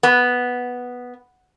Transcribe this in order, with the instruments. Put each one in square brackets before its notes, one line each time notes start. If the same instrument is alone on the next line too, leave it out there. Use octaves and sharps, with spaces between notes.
[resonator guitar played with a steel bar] B3